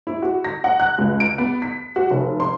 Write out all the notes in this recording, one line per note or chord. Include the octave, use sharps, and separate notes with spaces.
E4
F#4
A#6
F#5
F#6
C#2
D7
B3
B6
F#4
F1
C6